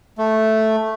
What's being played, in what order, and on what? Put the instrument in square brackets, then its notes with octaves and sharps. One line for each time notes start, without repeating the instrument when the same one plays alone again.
[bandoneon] A3